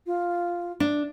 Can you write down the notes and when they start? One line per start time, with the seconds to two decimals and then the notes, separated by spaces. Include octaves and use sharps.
0.07 F4
0.80 D4